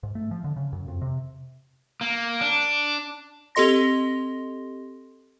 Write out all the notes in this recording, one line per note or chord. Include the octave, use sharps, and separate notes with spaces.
G#2
A3
F3
D3
C#3
F#2
F2
C3
A#3
D4
C4 G4 A4 D#5 C6 A#6